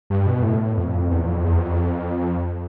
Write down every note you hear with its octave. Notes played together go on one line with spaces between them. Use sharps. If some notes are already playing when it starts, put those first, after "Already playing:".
G2
B2
A2
F2
E2
F2
E2
F2